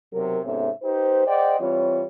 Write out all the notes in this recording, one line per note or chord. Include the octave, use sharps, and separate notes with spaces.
B1 C3 F#3 A#4
G#2 C3 B3 C#4 A4 E5
D#4 G4 B4 C5
G#4 C5 D5 D#5 F#5 G5
E3 G3 C4 F4 C#5